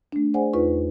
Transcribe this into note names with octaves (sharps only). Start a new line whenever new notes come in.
A3 D4
G#4 C5 D5 F#5 G#5
E2 D#4 F4 B4 C#6